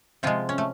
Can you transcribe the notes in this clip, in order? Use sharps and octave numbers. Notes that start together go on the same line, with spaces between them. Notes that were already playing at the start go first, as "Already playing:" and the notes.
C3 F3 G#3 F4
C#4
A3